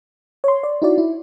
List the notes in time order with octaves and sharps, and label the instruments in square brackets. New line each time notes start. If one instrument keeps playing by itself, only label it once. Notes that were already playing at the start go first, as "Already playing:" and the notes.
[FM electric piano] C#5 C6
D5
D#4 E4 F#4 D5
E4